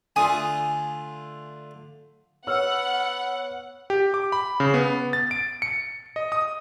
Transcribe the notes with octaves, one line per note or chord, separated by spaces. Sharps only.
D3 A3 F4 G#5 D#6
B3 C#5 F#5 E6 F6
G4
D6
B5
C#3
B3
A6
D7
C#7
D#5
D#6